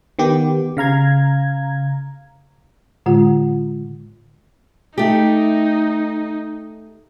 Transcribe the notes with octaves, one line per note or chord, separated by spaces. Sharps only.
D#3 B3 G4
C#3 F5 A#5 G#6
A2 D3 G#3 F4 F#5
A3 D#4 G4